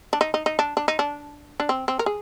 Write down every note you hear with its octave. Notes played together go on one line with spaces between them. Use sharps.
D4
D#4
D#4
D#4
D4
D4
D#4
D4
D4
C4
C4
A#4
G#4